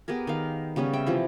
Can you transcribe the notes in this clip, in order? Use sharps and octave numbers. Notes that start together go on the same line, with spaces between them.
B3 G4 G#4 A#4
D#3 F5
C#3 G3 B3 C#4
E5 G5
C3 E3 F3